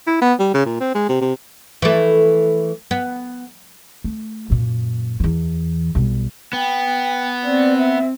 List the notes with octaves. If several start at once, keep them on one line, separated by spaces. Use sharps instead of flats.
E4
B3
G3
C#3
A#2
C4
G#3
C3
C3
E3 A3
B3
A3
F#2 A#2
E2 E3
B1 G3
B3 G5
C4 D5
E5